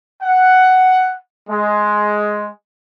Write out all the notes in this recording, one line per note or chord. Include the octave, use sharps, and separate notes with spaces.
F#5
G#3